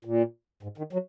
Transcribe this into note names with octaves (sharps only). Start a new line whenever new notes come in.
A#2
G#2
D#3
F#3